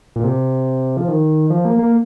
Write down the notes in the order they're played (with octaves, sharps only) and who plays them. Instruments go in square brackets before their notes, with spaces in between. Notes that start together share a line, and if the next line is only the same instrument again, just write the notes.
[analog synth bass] A#2
C3
F3
D#3
F3
A#3
A#3